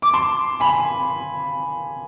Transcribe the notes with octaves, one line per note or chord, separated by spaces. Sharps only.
D6
A5 C6
G#5 B5